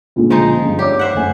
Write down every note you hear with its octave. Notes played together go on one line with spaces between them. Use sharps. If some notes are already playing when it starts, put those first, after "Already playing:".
C#2 A#2 D3
F3 G#3 D#4
G2
G4 C#5 D5 D6
C5 E5 F#5
F#1 A3 G#5